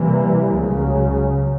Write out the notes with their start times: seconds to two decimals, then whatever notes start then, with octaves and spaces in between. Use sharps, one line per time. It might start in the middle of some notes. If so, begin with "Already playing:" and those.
Already playing: C3 E3 G3 A#3
0.53 C#2 C#3 F#3